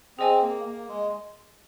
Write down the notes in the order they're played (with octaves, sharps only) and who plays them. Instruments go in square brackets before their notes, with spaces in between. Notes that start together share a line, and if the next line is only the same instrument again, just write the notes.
[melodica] C4 [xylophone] G#4 D#5 G#5
[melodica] A#3
A#3
G#3